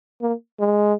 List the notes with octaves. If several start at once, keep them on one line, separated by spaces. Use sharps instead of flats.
A#3
G#3